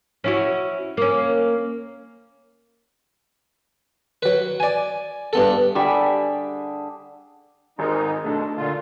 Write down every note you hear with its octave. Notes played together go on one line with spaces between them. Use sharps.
C#4 E4 F#4
A#3 C#4
F#3 B4
D5 G#5
G2 B3 A4
D3 G3 G4 G#4 D5 E5 G5
G#1 G#2 G#3 D#4 A#4
B2 G#3 A3 D4 A4
A#2 D3 F4